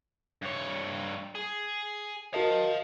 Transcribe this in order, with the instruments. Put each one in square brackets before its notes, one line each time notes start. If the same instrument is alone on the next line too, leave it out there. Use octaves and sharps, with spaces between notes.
[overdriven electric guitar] G2 C#5
G#4
[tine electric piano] F#4 A#4 D#5 [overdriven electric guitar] F5 A5